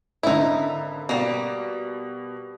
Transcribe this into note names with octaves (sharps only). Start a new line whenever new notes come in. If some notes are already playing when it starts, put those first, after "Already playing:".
G#1 D3 D#4 E4
B2 G3 A#3